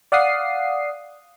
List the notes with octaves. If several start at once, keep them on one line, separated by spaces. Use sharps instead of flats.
D5 F5 F#5 D#6 C7